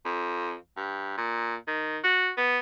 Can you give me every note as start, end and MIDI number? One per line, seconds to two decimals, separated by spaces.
0.05 0.54 41
0.76 1.17 43
1.17 1.55 46
1.67 1.98 51
2.04 2.30 66
2.37 2.58 59